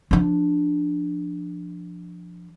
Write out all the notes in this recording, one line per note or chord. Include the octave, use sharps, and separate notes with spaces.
F3 D4